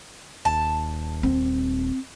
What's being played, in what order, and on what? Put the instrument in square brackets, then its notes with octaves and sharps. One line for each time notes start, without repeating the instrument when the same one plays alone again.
[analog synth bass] D#1 [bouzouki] A5
[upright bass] C4